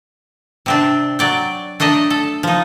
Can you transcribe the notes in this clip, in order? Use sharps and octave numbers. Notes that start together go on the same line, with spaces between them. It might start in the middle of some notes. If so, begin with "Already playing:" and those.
C3 C4 D4
F#3 D5 G5
A3 D4 D#5 E5 A#5
A4
F3 D#4